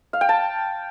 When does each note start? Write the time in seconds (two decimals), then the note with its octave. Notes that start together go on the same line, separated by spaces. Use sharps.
0.13 F5
0.21 G5
0.29 A5